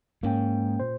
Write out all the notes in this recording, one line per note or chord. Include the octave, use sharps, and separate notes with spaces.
G#2 A#3 C#4 G5
A#2 C5